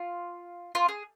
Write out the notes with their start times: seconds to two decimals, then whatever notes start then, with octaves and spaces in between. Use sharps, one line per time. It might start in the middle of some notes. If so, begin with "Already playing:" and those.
Already playing: F4
0.75 F4
0.88 G#4